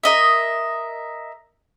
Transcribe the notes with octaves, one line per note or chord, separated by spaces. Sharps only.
A#4 D#5 E5